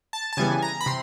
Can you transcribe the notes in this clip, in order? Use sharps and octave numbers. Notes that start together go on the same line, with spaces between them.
A5
A5
C#3 E3 G3 B3 G#5
A#5
B5
C3 C6